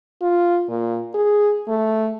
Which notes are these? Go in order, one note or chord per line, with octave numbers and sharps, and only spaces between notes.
F4
A#2
G#4
A3